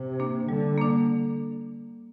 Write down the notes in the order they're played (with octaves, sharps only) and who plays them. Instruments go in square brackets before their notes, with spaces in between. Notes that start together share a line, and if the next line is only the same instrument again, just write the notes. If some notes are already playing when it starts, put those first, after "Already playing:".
Already playing: [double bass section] C3
[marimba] A#3 D4
[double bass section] D3 [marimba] G3
[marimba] A#3 D4